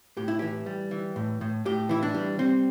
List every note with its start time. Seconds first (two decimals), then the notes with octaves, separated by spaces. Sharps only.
0.17 A2 G4
0.28 E4
0.39 E3 G4
0.66 G3
0.91 E3
1.16 A2
1.41 A2
1.65 A2 G4
1.89 E3 E4
2.03 D4
2.14 G3
2.39 G3 C4